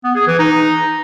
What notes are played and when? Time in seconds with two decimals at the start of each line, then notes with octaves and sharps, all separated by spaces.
0.04 B3
0.16 G#4
0.27 E3
0.39 D#4